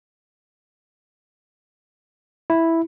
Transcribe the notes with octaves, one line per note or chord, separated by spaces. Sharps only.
E4